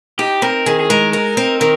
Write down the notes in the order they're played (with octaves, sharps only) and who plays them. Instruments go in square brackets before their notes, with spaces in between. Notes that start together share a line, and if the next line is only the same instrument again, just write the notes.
[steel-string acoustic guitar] D#4 [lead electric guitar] G4
[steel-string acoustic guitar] C4 [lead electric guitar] A#4
[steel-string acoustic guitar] D#3 [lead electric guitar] G#4
[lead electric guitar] G#4
[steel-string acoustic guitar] G#3 [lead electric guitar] A#4
[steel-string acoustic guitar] D#4 [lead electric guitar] A#4
[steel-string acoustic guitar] C4
[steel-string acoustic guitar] D#3 [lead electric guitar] A#4